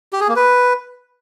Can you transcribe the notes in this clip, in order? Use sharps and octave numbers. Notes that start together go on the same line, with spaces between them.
G4
G#4
A#3
B4